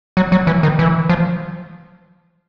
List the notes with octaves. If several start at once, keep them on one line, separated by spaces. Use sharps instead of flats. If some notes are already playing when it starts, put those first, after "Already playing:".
F#3
F#3
E3
D#3
E3
F3